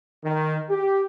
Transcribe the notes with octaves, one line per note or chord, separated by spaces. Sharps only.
D#3
G4